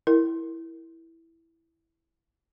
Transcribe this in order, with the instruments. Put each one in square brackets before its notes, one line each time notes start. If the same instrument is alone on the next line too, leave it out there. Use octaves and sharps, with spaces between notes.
[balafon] E4 A#4